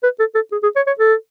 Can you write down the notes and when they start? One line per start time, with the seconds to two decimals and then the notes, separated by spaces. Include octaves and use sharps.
0.03 B4
0.19 A4
0.35 A4
0.52 G#4
0.63 G#4
0.76 C#5
0.87 C#5
0.99 A4